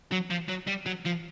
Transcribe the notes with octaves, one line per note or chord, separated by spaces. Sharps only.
F#3
F3
F#3
G3
F#3
F3